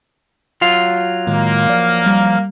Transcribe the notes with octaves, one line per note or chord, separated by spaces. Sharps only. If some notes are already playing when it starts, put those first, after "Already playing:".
F#3 F4 F5
A2 D#3 G#3 A#3
F3 D5 F6
G3